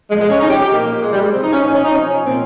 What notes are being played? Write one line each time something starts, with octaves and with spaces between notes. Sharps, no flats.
A#2 F3 G#3
G#3
C#4
C3 F3 D#4
G4
G4
A#2 F3 A#3
A#2 F3 G#3
G3
G#3
C3 F3 C4
D#4
C#4
A#2 F3 D#4
C#4
D#4
C3 F3 C#4
A#2 F3 C4